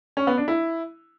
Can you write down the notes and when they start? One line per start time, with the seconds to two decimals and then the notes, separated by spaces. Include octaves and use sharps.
0.17 C#4
0.27 B3
0.37 D4
0.48 E4